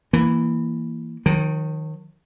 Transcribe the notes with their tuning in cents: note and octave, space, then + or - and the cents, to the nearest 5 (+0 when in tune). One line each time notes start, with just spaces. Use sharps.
E3 +0 A#3 +0
D#3 +5 F#3 -45